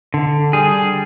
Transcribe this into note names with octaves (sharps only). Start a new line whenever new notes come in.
D3
G3 G#4